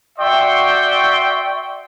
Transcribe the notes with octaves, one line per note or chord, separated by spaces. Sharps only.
F#4 D5 E5 G5 C6 C#6